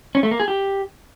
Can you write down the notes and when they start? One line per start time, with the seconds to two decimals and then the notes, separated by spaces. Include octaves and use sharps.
0.15 C#4
0.23 A3
0.31 A#3
0.40 G#4
0.48 G4